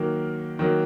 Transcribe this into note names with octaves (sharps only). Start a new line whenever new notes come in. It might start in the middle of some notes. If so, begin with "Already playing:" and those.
Already playing: D#3 F#3 A#3
D#3 F#3 A#3